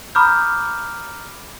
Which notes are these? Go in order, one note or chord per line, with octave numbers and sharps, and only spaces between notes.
A#5 B5 D6 D#6 F6 G6